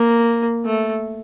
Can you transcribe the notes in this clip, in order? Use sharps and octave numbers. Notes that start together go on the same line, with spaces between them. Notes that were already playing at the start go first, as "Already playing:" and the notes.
Already playing: A#3
A3